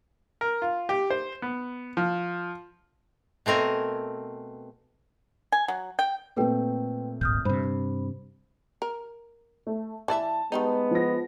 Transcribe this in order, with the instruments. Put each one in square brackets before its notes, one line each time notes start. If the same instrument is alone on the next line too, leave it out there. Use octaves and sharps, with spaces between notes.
[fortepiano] A#4
F4
G4
C5
B3
F3
[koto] B2 A3 C4 A#4 G#5
[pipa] G#5
F#3
G5
[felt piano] A#2 A3 C4 [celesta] A4 B4 G5
[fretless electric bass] D1 G#1 [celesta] D#6 F6 G6
[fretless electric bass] G2 C3 [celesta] C5 B5
[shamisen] A#4
[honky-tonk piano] A3
[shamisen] E3 D5 E5 [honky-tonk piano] A5
[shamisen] D#3 G3 D#4 [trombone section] G#3 B3
[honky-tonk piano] F3 A#6